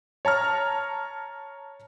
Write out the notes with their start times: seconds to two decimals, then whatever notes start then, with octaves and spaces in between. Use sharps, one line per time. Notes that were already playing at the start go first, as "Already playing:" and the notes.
0.25 C#5 A5 A#5 F6